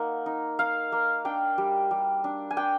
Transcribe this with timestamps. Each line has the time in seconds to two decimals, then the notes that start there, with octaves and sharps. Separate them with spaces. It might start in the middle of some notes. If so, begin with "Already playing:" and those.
Already playing: A#3 D#4 F#5
0.26 D#4
0.59 D#4 F5
0.92 A#3
1.25 D4 G5
1.58 G3
1.91 G3
2.24 D4
2.51 G#5
2.57 D4 G5